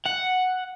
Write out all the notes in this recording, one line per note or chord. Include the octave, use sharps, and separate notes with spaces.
F#5